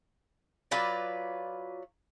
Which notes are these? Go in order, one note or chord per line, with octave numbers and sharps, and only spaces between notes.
F#3 F4 B4 D5